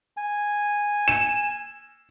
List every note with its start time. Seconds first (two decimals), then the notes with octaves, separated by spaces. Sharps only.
0.17 G#5
1.08 E7